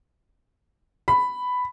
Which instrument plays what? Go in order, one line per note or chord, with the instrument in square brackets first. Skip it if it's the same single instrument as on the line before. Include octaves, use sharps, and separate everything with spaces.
[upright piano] B5